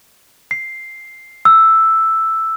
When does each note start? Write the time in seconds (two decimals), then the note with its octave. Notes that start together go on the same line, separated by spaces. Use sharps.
0.51 C7
1.45 E6